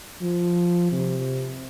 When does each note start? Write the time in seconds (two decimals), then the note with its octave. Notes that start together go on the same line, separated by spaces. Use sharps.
0.22 F3
0.92 C3